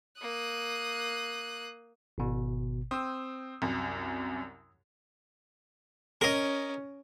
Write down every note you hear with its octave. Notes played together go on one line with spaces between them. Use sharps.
A#3 D#6 F#6
G#1 B2
C4 D#6 E6
C2 F#2
C#4 A#4 D#5